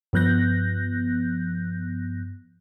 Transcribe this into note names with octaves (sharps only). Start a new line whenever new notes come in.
G2 F3 B3 F#6 G6 A#6